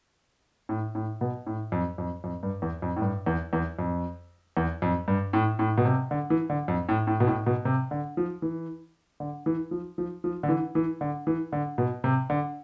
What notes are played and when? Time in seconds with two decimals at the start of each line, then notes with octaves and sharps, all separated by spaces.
0.69 A2
0.95 A2
1.21 B2
1.47 A2
1.72 F2
1.98 F2
2.24 F2
2.43 G2
2.62 E2
2.82 F2
2.96 A2
3.02 G2
3.26 E2
3.53 E2
3.79 F2
4.57 E2
4.82 F2
5.08 G2
5.33 A2
5.59 A2
5.78 B2
5.85 C3
6.11 D3
6.30 E3
6.50 D3
6.68 F2
6.89 A2
7.07 A2
7.20 B2
7.27 A2
7.47 B2
7.65 C3
7.91 D3
8.17 F3
8.42 E3
9.20 D3
9.46 E3
9.71 F3
9.98 F3
10.24 F3
10.43 D3
10.49 E3
10.75 E3
11.01 D3
11.27 E3
11.52 D3
11.78 B2
12.04 C3
12.30 D3